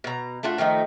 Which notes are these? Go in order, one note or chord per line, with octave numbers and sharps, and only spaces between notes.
B2 A#5
A3 D4 F4 F#4
D#3 F3 A3 D#4